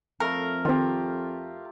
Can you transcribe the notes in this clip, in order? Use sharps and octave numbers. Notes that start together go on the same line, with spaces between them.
F2 A3 A#4 F5
D#3 C4 F4 G4